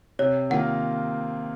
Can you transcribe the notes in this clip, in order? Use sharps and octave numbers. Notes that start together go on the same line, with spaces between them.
C3 C#5
D#3 A#3 F4 F#5